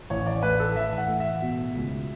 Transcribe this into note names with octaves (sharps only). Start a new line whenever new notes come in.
A1 C#5
D5
A2 B4
A4
E3 E5
F#5
A2
E5
B2
C#2